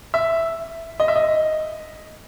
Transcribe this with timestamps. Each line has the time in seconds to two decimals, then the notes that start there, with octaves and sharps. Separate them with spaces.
0.14 E5
1.00 D#5
1.08 E5
1.16 D#5